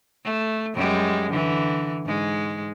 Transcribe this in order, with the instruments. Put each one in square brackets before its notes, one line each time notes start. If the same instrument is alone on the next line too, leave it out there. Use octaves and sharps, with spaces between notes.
[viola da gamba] A3
F#2 G3 G#3
D3 E3
G#2 G#3